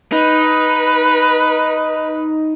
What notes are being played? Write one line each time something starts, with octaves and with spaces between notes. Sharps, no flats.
D#4 B4